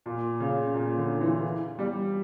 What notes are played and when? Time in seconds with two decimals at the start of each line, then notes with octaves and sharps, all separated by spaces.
0.06 A#2
0.40 C#3
0.74 A#2
0.98 D3
1.21 E3
1.79 G3